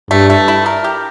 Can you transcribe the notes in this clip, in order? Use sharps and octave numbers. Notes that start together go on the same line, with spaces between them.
G2 A3
A3
E4
A#4
G4